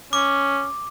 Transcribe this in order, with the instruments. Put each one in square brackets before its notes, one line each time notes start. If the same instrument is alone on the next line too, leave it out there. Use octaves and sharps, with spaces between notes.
[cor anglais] C#4 [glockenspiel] D6